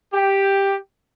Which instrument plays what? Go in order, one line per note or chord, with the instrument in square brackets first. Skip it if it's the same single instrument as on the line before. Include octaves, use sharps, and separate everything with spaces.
[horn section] G4